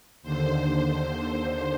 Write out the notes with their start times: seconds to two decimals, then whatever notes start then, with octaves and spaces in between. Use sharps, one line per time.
0.23 D#2 D3 C5
0.58 C5